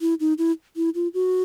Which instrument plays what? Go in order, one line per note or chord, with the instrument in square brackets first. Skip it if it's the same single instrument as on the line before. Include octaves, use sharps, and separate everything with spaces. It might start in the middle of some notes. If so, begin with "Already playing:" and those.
[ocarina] E4
D#4
E4
E4
F4
F#4